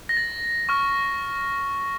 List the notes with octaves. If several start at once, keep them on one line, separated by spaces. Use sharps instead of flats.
A#6
A6
C#6 F6